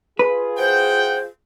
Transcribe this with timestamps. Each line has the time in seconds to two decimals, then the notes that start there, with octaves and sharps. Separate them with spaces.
0.19 F4 G#4 B4
0.58 F#3 C5 F#5 G5